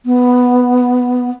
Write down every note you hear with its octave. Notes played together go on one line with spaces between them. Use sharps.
B3